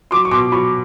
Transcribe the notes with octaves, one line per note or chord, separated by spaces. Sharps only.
F#3 C6 D6
C#6
B2 C6 D6
F#3 B5 C#6